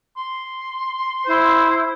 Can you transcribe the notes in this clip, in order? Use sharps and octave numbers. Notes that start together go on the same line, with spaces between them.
C6
E4 C5